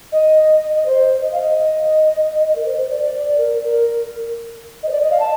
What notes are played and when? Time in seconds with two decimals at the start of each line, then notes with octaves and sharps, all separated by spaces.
0.12 D#5
0.86 C5
1.21 D#5
1.32 F5
1.41 D#5
2.55 A#4
2.65 C5
2.78 C5
2.90 D5
3.03 D5
3.38 A#4
3.64 A#4
4.83 D#5
4.88 C5
4.92 D5
5.01 D#5
5.11 F5
5.20 A5